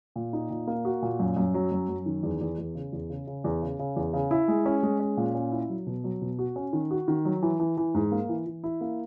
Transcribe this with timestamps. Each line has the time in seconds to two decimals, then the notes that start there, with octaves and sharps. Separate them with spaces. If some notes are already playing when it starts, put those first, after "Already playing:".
0.16 A#2
0.33 D#4
0.50 A#2
0.67 A#3
0.85 F#4
1.02 A#2
1.20 F#2
1.37 F#2
1.54 F#3
1.71 F#2
1.89 F#2
2.06 D#3
2.23 E2
2.41 E2
2.58 E2
2.75 C#3
2.93 E2
3.10 C#3
3.27 C#3
3.44 E2
3.62 C#3
3.79 C#3
3.96 E2
4.13 C#3
4.31 E4
4.48 G#3
4.66 C#4
4.83 G#3
5.00 C#4
5.17 A#2
5.35 C#4
5.52 E4
5.69 F#3
5.87 B2
6.04 F#3
6.22 B2
6.39 F#4
6.56 C#4
6.73 D#3
6.91 F#4
7.08 D#3
7.25 F#3
7.42 E3
7.59 E3
7.77 E3
7.95 G#2
8.12 A#3
8.29 E3
8.46 E3
8.64 E4
8.81 A#3